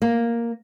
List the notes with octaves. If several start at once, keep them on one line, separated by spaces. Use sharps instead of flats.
A#3